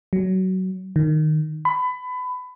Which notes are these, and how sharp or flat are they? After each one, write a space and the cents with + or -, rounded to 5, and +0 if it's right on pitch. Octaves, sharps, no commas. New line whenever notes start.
F#3 +15
D#3 -15
B5 +25